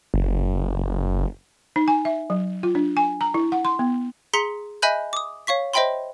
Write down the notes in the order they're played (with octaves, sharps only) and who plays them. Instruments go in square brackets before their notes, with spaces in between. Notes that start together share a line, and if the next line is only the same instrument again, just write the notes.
[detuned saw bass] F#1
[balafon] D#4
G#5
E5
F#3
F4
D4
G#5
A#5
E4
F#5
C6
B3
[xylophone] G#4 A#5 C6 B6 C#7 G7
D#5 E5 G#5 B5 F#6 G6
D6 D#6
C#5 F5 C#6 B6
C5 D#5 E5 G5 B5 C6